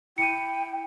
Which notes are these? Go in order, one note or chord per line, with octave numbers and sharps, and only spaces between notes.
E4 G5 C#7 D#7